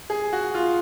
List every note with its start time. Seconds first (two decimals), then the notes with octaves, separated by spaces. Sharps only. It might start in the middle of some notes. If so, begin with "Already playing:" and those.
0.10 G#4
0.33 F#4
0.54 F4